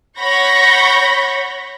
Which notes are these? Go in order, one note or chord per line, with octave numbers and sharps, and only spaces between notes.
C#5 F#5 B5 C#6 G6 A#6